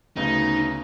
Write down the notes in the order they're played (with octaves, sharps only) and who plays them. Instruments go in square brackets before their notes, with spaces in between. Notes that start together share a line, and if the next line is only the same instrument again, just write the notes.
[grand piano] D2 C#3 B3 [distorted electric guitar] D#4 [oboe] A#5